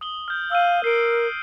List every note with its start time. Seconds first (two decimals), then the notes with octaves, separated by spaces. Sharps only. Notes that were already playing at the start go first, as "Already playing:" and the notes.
0.01 D#6 F#7 G7
0.28 F6 G6
0.52 F5 E6 F6 D#7
0.84 A#4 C7 D7